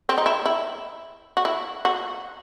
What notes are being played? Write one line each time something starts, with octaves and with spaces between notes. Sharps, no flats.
C4
D#4
E4
E4
F#4
E4
F#4